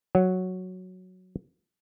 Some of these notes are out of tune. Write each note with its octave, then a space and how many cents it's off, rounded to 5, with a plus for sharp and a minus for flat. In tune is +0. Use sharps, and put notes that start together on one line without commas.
F#3 -5 C#5 +0 F#5 +0